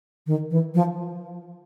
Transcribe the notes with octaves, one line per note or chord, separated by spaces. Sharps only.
D#3
E3
F3